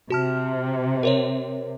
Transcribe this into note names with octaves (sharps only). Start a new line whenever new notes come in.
C3 F#4 A5 F6
A#4 C5 C#5